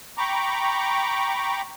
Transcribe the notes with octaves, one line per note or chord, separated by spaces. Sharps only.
G5 A#5 B5 C#6 D6